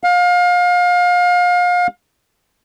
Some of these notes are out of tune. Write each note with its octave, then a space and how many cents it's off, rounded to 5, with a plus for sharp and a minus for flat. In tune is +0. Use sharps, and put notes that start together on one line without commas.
F5 +30